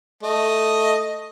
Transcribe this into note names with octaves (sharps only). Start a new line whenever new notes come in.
A3 D#5